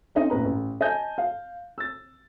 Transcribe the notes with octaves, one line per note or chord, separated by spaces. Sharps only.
C4 C#4 D#4 D#5
A1 A#2 B4 A#5
A1
D#5 G#5 A5 G6
F5
E6 A6